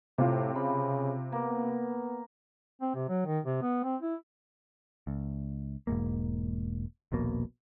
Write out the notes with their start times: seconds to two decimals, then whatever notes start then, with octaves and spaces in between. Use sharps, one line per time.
0.18 A2 C3 F4
0.55 C#3 B5
1.32 A#3 B3
2.81 C4
2.95 C3
3.09 F#3
3.26 D#3
3.46 C3
3.62 B3
3.83 C4
4.01 E4
5.07 C#2
5.87 E1 G#2 A#3
7.12 D#1 A#1 B2 A#3